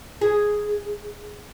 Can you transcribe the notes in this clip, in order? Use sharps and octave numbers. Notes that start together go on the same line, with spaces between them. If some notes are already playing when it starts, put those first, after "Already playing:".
G#4